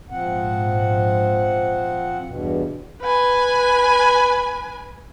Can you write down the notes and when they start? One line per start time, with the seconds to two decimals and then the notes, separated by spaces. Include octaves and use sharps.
0.10 A#1 G#2 F3 C4 F#5
2.26 E2 G2 B2
3.02 B4 G#5